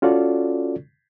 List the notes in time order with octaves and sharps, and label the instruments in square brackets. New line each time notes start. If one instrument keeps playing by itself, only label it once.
[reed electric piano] C#4 F4 F#4 A4 D5